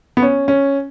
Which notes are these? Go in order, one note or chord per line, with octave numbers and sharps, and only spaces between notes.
B3
C#4
C#4